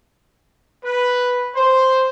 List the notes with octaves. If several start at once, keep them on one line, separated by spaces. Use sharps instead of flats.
B4
C5